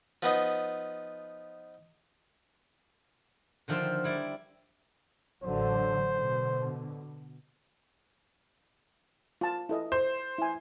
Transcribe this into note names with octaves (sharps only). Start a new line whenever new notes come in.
F3 B3 D#4
D3 D#3 F3 E5 G5 C6
G3 E4 D5
A1 D3 F#3 C5
B2 D3
F4 A5
E4 A4 D#5
C5
E4 G#5